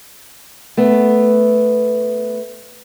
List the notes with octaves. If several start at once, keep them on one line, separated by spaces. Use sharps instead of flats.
A3 B3